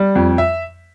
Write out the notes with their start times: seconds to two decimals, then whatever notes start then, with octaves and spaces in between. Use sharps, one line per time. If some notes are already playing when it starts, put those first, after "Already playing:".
Already playing: G3
0.15 F2
0.38 E5